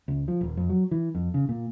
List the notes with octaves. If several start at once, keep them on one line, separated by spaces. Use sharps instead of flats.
C#2
F3
D#1
F2
F#3
E3
F2
C#3
A#2